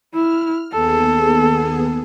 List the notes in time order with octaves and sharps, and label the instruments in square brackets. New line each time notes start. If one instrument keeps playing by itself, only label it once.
[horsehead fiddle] E4 [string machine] F6
[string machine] D#2 B3 G#4 [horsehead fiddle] A4